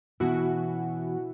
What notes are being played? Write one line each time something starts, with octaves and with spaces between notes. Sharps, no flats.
B2 E3 C#4 E4 F#4